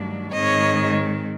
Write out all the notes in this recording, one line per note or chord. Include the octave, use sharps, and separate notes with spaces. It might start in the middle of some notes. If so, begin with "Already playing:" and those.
Already playing: G2 D#3 F#3 A3 D4
G#2 D#3 G#3 C4 C#5 D#5